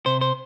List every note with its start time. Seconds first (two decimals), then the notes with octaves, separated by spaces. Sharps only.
0.06 C3 C5
0.21 C5